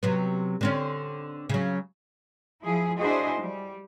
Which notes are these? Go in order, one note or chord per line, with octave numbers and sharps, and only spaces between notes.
C3 F#3 B3
D3 C4 C#4
C#3 F#3
F3 E4 G#4
D4 E4 F#4 G#4 C5 D#5
G3